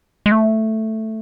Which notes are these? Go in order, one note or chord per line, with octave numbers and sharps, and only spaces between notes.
G#3
A3